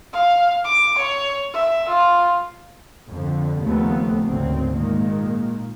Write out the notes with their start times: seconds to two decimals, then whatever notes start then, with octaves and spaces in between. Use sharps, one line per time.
0.13 F5
0.64 D6
0.98 C#5
1.54 E5
1.88 F4
3.11 F2 D3
3.62 D#2 C#3 F3 A3 B3 C4
4.26 G#1 D2 C#3 C4
4.74 A#2 D#3 G#3 A#3